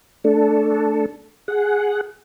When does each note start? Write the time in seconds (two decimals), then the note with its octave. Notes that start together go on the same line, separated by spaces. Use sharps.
0.24 A3 D4 A4
1.48 G#4 F#5